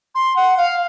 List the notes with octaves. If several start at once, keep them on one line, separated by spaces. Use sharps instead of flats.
C6
F#5
F5